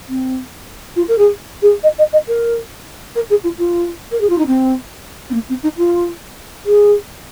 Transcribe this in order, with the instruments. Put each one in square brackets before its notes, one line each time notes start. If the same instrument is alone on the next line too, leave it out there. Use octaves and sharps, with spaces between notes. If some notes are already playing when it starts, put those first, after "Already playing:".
[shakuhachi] C4
F4
A#4
G#4
G#4
D#5
D#5
D#5
A#4
A#4
G#4
F4
F4
A#4
G#4
F4
D#4
C4
C4
A#3
C4
D#4
F4
G#4